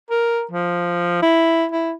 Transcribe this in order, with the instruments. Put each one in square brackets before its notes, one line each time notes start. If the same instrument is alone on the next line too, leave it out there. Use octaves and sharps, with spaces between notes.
[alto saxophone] A#4
F3
E4
E4